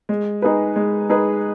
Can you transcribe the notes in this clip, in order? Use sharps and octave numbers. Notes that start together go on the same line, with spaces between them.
G#3
D#4 G#4 B4
G#3
D#4 G#4 B4